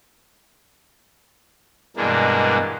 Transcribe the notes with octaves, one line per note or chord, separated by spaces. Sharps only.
G2 B2 E3 G#3 A#3 D4